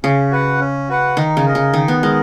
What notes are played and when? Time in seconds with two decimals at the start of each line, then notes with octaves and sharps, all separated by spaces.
0.04 C#3 C#4
0.31 F#4 B4 F#5
0.60 C#4
0.89 F#4 B4 F#5
1.17 D#3 D#4
1.37 C#3
1.46 A#4 D#5
1.55 C#3
1.73 D#3 D#4
1.88 B3
2.03 G#3 A#4 D#5